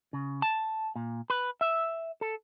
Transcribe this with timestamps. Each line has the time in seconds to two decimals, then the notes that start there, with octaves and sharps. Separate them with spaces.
0.13 C#3
0.42 A5
0.96 A#2
1.30 B4
1.61 E5
2.21 A4